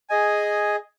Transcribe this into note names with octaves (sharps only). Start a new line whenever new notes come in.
G#4 D#5 G#5